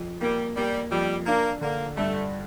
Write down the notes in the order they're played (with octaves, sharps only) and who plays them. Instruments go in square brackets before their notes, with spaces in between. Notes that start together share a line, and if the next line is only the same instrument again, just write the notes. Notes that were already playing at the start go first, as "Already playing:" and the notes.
Already playing: [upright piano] F2
[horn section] G3 [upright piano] A#3
[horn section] G3 [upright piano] A#3
[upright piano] F2 [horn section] G3
[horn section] A#3 [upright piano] D4
[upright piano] D3 [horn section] A#3
[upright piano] G2 [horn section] A3